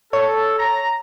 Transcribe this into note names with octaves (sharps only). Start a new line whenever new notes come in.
A4 C#5
A#5